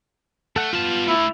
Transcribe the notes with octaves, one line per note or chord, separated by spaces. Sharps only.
A3 A4 F#5
G3 B3 F4 A5
D3 A3 E4